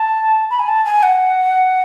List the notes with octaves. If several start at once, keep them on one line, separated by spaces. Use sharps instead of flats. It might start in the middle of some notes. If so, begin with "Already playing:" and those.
Already playing: A5
B5
G#5
A5
G#5
F#5